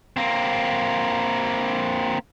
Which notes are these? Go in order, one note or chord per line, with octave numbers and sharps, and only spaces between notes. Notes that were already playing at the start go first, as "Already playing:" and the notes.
A#3 C4